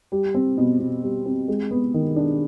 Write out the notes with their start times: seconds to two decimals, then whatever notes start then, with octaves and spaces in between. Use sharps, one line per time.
0.12 G3
0.35 C4
0.57 B2
0.80 B2
1.03 G3
1.26 C4
1.48 G#3
1.71 B3
1.94 D#3
2.16 D4